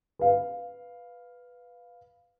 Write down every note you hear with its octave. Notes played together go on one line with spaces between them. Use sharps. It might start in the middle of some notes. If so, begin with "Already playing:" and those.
B4 F5